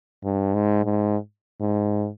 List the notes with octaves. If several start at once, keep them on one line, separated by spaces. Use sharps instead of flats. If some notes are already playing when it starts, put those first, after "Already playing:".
G2
G#2
G#2
G#2